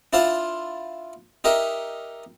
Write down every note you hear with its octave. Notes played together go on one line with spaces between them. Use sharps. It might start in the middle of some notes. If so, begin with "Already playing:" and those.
D4 E4 F4 C5 F5 A5
D#4 G4 A#4 E5